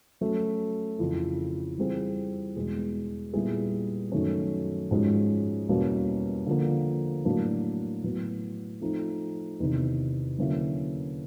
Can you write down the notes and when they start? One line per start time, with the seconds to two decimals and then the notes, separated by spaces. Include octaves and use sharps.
0.21 F#3 A3 C#4
0.99 F2 C#3 E3
1.77 E3 G3 C4 F4 G#4
2.56 E2 B2 G#3
3.33 A#2 G3 B3 E4 G#4
4.12 F#2 D#3 F#3 A3 C#4
4.91 G#2 F3 G#3 C#4 F#4
5.69 E2 B2 G3 A#3 C#4
6.46 D3 F3 A#3
7.25 A2 F#3 A#3 D4
8.04 A2 F#3 B3
8.81 F3 A3 C4 D#4
9.60 E2 C3 D#3
10.38 D3 F#3 A#3 C#4 E4